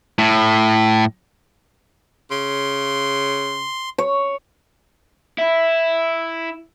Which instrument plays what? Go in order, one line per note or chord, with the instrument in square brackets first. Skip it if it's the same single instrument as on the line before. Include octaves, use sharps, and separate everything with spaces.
[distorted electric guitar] A2
[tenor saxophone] C#3 [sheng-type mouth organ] C6
[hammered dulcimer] C#5
[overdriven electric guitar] E4